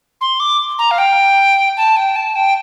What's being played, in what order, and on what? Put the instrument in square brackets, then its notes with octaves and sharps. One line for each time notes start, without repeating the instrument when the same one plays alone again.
[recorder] C6
D6
A#5
F5
G5
A5
G5
A5
G5